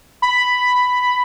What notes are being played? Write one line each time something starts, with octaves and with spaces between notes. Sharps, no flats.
B5